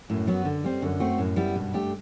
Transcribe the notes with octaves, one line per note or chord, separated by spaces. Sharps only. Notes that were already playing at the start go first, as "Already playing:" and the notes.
F#2 A2
F#3 B3 F#4
D3
G3 C4
F#2 D3
A3 C4 F#4
F#2 A2
G3 B3 E4
G2 B2
A3 D4 G4